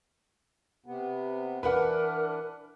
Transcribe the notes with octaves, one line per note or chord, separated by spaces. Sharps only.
C3 B3
E3 D4 A#4 B4 F#5